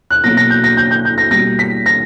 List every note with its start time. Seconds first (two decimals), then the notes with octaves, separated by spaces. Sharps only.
0.10 F#6
0.24 B2 F#3 A#3 A#6
0.37 A#6
0.50 G6
0.64 A#6
0.77 G6
0.91 G6
1.05 G6
1.18 A#6
1.31 B2 G3 A#3 A#6
1.59 B6
1.86 A#6